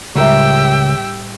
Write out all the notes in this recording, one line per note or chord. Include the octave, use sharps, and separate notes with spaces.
C#2 A2 G3 G4 A#4 E5 G5 E6